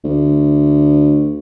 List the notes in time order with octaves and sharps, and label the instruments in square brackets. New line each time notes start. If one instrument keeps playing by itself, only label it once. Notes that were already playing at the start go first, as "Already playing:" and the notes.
[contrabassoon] D2